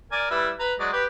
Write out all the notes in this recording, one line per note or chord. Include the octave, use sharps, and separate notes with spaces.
A#4 D5 G#5
G3 E4 B4
B4 A#5
F#3 G#3 D5
G4 B4 G5